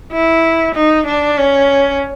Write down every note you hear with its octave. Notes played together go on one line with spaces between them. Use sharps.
E4
D#4
D4
C#4